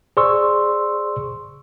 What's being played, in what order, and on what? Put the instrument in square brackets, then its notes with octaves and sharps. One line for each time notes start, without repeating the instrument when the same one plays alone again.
[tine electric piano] G#4 C5 D5 C6 C#6 E6